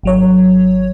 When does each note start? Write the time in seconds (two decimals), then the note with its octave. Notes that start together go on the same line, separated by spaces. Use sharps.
0.03 G#1 F#3 C#5